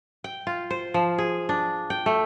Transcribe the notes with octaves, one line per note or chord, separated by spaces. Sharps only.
G5
F4
C5
F3
G#4
D4
G5
A3